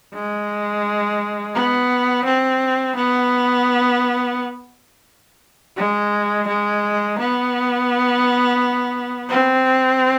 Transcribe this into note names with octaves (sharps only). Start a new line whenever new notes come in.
G#3
B3
C4
B3
G#3
G#3
B3
C4